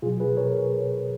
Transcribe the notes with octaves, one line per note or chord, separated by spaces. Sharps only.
B2 F#3 F4 G#4
G#4 B4
A#4 C#5